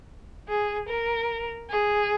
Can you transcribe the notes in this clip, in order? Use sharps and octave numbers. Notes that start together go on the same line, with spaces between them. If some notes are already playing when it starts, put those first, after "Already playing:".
G#4
A#4
G#4